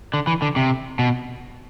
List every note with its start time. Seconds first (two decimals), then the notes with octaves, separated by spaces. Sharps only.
0.14 D3
0.27 E3
0.42 D3
0.56 C3
0.99 B2